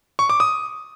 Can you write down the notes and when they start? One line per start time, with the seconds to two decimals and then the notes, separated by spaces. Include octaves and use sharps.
0.19 C#6
0.30 D6
0.40 D#6